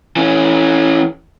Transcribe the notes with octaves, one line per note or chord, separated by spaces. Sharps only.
E3 C#4